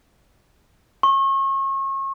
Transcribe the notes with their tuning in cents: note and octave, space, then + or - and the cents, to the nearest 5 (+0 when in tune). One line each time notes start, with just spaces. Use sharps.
C#6 -35